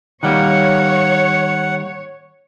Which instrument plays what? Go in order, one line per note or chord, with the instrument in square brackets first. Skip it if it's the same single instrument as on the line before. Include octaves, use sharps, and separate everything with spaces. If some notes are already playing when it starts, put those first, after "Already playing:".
[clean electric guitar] D#3 G3 A#3 [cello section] C#5 [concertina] F#5